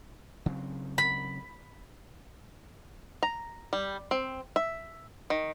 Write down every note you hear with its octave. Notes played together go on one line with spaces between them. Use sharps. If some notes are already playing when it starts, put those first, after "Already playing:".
C#3 F#3 C4
B5
A#5
G3
C4
E5
D#3